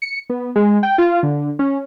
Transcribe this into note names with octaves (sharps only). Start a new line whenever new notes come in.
C#7
B3
G#3
G5
F4
D3
C#4